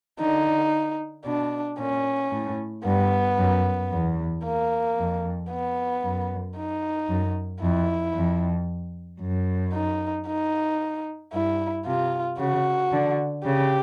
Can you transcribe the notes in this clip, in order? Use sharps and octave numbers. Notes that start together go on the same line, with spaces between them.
D3 D#4
B2 D4
A#2 C#4
A2
G2 B3
F#2
E2
A#3
F2
B3
F#2
D#4
F#2
F2 E4
F2
F#2
D#4
D#4
G2 E4
C3 F4
C#3 F#4
D3
C#3 G4